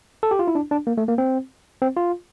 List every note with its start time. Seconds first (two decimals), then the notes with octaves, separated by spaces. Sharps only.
0.23 A4
0.31 G4
0.39 F4
0.47 E4
0.55 D4
0.71 D4
0.87 A#3
0.98 A3
1.08 A#3
1.18 C4
1.82 C4
1.97 F4